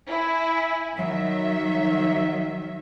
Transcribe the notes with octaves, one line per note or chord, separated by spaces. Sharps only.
E4 G#5
D#3 F#3 E5